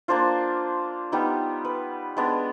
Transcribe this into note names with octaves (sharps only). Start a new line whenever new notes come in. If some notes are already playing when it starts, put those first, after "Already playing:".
A#3 D4 F4 C5
G3 B3 D#4
B4
G#3 B3 D4